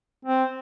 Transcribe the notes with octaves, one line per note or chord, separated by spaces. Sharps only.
C4